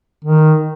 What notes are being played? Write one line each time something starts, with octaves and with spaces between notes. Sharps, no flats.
D#3